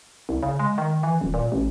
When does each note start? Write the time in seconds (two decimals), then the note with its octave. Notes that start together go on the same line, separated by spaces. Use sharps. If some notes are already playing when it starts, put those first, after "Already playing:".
0.29 C2
0.43 C#3
0.59 G#3
0.78 D#3
1.03 E3
1.21 D#1
1.34 A#2
1.52 A1